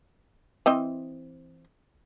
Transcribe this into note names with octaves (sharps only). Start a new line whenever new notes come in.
E3 C4 D#5